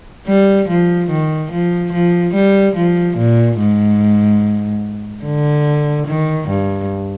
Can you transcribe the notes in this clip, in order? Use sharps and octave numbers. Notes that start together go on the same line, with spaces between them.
G3
F3
D#3
F3
F3
G3
F3
A#2
G#2
D3
D#3
G2